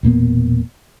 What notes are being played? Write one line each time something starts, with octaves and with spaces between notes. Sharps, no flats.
E1 A#2 A#3 B3